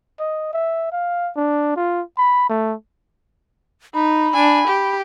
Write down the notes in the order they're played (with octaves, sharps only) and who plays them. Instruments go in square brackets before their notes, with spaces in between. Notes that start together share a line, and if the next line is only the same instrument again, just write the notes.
[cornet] D#5
E5
F5
D4
F4
B5
A3
[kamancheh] D#4 [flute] B5
[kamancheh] D4 G#5
G4